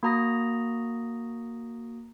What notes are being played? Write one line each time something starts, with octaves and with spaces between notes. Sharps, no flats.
A#3 F#4 A#5 D#6 A#6